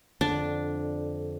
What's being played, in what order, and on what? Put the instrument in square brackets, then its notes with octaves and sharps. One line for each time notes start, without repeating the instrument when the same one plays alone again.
[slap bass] F2 D3 [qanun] D4